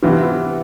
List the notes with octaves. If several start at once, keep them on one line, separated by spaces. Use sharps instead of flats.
C3 E3 B3 F4